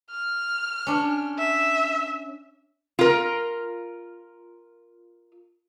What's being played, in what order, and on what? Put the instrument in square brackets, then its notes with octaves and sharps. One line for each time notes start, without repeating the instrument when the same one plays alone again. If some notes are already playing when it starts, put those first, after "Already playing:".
[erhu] F6
[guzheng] C#4 D4
[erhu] E5
[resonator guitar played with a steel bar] F4 A#4